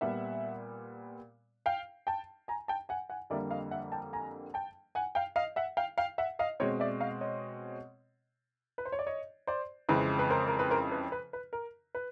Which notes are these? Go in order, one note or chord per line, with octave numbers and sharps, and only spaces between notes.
A#2 G3 B3 E5 F#5
F5 G5
G5 A5
G#5 A#5
G5 A5
F#5 G#5
F#5 G#5
F2 D3 G3 A#3 D5 E5
D#5 F5
E5 F#5
G5 A5
G#5 A#5
G5 A5
F#5 G#5
F5 G5
D#5 F5
E5 F#5
F5 G5
F5 G5
E5 F#5
D#5 F5
B2 G#3 C4 C#5 D#5
D5 E5
D#5 F5
C#5 D#5
B4
C5
C#5
D5
C#5 D#5
C5 D5
F2 C#3 E3 G#3 C4 B4
B4
A#4 C5
A#4
B4
A#4 C5
B4
B4
B4
A#4
B4